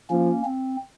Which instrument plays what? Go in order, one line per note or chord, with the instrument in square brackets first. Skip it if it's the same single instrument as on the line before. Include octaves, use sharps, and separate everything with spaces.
[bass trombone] F3 [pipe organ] A#3 C#4
[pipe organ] C4